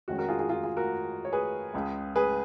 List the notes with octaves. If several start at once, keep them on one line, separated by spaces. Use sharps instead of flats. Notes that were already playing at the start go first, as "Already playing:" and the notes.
F2 D#3 G#3 C#4 F#4
F#4 A#4
F4 G#4
F4 G#4
F4 G#4
F4 G#4
F#4 A#4
C#5
G#4 B4
C#2 C#3 G#3
G#4 B4